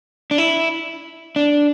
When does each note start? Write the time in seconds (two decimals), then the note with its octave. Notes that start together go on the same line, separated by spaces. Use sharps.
0.31 D4
0.38 E4
1.36 D4